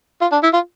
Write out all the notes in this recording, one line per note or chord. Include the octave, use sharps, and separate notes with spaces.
F4
D4
E4
F4